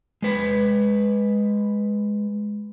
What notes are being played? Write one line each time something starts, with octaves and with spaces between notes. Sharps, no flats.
G#3 B4